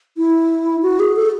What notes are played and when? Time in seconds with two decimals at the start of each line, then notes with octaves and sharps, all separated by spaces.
0.18 E4
0.82 F#4
0.99 G#4
1.16 A4